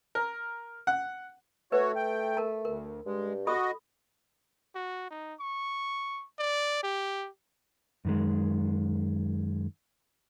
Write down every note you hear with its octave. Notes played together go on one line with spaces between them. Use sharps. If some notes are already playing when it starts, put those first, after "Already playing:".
A#4
F#5
A3 F#4 B4 C#5
G5
A#4 A5
D2 A#4
G2 G#3
F#4 A4 D#5 B5 D#6
F#4
D#4
C#6
D5
G4
F#2 D#3 G#3